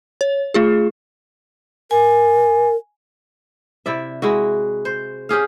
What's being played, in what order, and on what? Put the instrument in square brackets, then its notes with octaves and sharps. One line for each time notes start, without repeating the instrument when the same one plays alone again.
[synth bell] C#5
A3 F4 G#4
[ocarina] A#4 [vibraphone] G#5
[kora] C3 E4 D5 E5
G#3 E4 F#4
C5
C#4 G4 G#4 F5